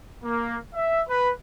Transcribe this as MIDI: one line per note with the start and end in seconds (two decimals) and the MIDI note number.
0.24 0.57 58
0.74 1.02 76
1.08 1.30 71